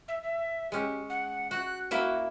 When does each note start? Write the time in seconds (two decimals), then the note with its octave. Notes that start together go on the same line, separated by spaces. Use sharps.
0.08 E5
0.23 E5
0.72 G#3 C#4 G4
1.10 F#5
1.51 F#4 F#6
1.91 A#3 E4 F#4 E5